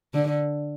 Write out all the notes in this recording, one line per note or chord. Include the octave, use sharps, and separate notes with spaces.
D3